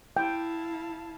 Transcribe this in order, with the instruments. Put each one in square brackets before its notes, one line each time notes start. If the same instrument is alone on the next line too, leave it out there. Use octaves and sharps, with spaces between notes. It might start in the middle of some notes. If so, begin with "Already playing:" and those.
[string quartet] E4 F5 A5 [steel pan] G5